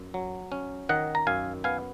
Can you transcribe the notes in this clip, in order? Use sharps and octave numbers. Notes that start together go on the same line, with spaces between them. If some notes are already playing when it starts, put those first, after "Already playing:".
Already playing: F#2
F#3
C#4
D#3 D#5 F#5
A#5
F#2 F5 G#5
B3 F5 G#5